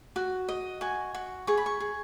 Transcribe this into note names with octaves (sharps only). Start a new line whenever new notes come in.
F#4
D#5
F#4 G#5
F#4
G#4 C#6
B5
C#6
G#4